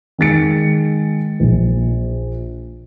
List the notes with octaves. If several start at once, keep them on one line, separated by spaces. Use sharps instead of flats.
D#3 G#3 A6 C#7
A#1